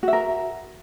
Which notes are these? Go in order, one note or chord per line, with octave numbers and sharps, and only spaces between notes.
F#4 A#4 E5